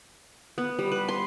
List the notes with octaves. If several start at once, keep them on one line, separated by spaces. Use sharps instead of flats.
B3
G3
B4
C6